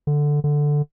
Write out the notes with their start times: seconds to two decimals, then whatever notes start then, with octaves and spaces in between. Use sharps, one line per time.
0.07 D3
0.44 D3